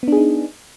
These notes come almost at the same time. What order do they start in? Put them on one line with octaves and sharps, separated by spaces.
B3 D4 G#4 D#4